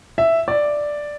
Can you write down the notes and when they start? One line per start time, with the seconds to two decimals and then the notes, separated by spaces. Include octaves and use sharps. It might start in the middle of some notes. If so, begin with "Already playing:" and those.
0.18 E5
0.48 D5